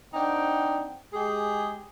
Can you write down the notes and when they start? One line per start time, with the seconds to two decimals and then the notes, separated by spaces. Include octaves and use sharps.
0.14 C4 D4 D#4 F#5 G5
1.13 G#3 G4 G#4